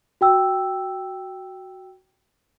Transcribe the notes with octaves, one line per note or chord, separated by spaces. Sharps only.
F#4 G5 E6